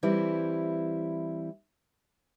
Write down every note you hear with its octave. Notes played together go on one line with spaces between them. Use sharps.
E3 G3 C4 E4